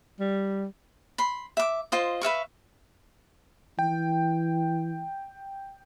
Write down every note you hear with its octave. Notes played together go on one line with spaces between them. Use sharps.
G3
B5 C6
E5 D6
F4 C5 D#5
B4 E5 F5 C#6
E3 G5